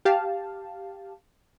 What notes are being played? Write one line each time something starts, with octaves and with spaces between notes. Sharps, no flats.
G4 F5 A5